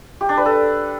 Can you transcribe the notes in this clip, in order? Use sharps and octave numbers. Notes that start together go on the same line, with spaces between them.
G4
D4
B4
A4